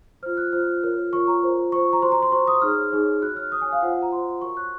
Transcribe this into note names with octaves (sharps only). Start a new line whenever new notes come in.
F4 C5 F6
F#6
F4 C5 F6
F4 A#4 C#5
F4 A#4 C#5 C#6
A#5
F4 C5
F4 C5 C#6
A#5
F#4 C5 C6
A#5
C6
F#4 C5 C#6
D#6
D#4 G#4 C#5 F6
D#4 G#4 C#5
F#4 C#5 F#6
F6
F#4 C#5 D#6
G#5
F5
F4 C5 F#5
A#5
F4 C5 C6
F#4 A#4 C#5 C#6
F#6